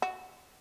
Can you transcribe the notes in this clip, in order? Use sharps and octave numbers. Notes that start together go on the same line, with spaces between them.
F#4